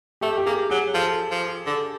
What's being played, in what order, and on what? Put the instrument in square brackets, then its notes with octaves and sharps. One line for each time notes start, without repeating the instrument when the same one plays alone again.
[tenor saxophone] A3 [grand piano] G4
[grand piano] G4
[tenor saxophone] A#3 [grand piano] G#4
[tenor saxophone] F#3 [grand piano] G#4
[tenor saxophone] F3 [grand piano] A4
[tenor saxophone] F3
D3